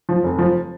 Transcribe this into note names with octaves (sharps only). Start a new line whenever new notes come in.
F3
F1
F3